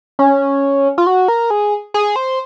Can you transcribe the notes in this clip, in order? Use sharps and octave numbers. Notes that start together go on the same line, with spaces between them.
C#4
F4
F#4
A#4
G#4
G#4
C5